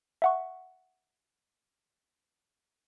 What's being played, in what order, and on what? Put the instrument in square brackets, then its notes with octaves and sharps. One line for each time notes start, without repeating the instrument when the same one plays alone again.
[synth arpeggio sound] E5 F#5 C#6